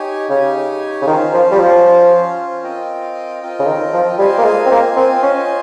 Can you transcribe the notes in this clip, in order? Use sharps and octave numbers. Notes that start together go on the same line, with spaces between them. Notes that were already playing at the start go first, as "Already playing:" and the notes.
Already playing: D#4 G4 C#5 G#5
C#3 D#4 G4 C#5 G#5
C#3
D#3 C#4 F4 C5
F3
G3
F3
C#4 F4 C5
C4 F4 A#4 D#5 G5
C4 F4 A#4 D#5 G5
C#3
D#3
F3
G3 F4 C5 D#5 G#5
A#3
G#3
C4
A#3
C4 F4 C5 D#5 G#5
C#4